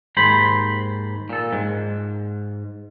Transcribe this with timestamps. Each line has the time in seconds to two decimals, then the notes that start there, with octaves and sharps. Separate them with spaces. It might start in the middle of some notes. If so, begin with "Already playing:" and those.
0.17 D#2 G#2 C5 B5
1.30 A#2 A4
1.53 G#2